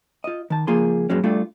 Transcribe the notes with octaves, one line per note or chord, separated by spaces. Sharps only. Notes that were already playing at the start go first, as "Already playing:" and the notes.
F4 D#5
D#3 A5
C#2 F3 A#3 F4 G#4 C6
G2 A#2 F#3 G#3 C#4
G3 A3 D4 F4